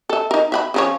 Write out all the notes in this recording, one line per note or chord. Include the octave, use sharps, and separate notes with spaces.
A4 E5
D#4 A#4
E5 F#5 B5
C#3 F3 C#5